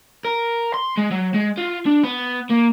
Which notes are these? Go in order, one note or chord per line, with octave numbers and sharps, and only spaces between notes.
A#4
C6
G#3
F#3
G#3
F4
D4
B3
A#3